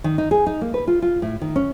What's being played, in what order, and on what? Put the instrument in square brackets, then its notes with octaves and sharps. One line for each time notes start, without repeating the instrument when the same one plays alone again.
[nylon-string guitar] D#3
D#4
G#4
D#4
A#3
B4
F4
F4
A2
D#3
C#4